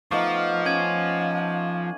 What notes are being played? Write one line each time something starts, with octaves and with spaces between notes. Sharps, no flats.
F3 A3 B3 D#4 F5 C#6 D6
C#4 F5 G#6 D#7 F#7